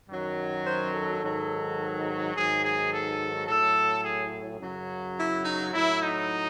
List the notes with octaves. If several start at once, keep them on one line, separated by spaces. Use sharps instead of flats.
F#2 D#3 F#3
C5
A4
G#2 D#3 F#3
G#2 D#3 F#3 G#4
G#4
A4
A2 F#3 A4
G#4
F#2 C#3 F#3
E4
D#4
A2 F#3 E4
D#4